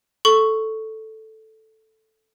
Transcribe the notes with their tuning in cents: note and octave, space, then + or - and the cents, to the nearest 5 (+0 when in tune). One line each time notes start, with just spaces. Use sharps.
A4 +0 C#6 +0